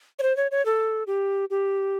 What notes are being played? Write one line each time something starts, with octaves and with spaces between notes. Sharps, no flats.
C#5
C5
C#5
C#5
A4
G4
G4